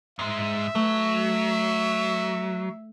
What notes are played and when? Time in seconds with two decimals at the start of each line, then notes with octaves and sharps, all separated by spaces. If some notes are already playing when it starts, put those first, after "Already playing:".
0.19 G#2 G#3 E5
0.75 F#3 A3